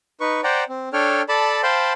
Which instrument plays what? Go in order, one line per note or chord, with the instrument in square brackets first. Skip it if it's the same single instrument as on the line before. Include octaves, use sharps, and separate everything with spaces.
[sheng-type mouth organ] D#4 B4 C#6
C5 D5 F#5 G5 A#5
C4
D4 A4 C#5 G5 F6
A4 D5 A5 B5
C5 F5 G5 A5 B5 C6